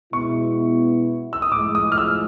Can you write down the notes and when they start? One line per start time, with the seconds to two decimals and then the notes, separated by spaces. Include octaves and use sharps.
0.13 B2 G#3 B3 E4 C#6
1.33 E6
1.42 D#6
1.52 A2 F3 G#3 D6
1.75 D#6
1.92 F6
1.98 E6